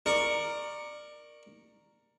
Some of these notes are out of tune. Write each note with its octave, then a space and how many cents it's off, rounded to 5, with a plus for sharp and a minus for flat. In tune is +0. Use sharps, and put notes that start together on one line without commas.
A#4 +0 D5 +20 C#6 +0